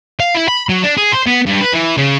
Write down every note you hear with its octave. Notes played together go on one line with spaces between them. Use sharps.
F5
E4
B5
F#3
D4
G#4
C5
B3
G2
B4
E3
C#3